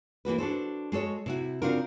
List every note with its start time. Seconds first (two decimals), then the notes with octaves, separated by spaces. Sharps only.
0.25 E3 A#3 F#4 B4
0.38 D4 F#4 A4 C5
0.92 G#3 F#4 A4 C#5
1.26 C3 E4 F#4
1.62 C#3 C4 D4 F4 F#4 A#4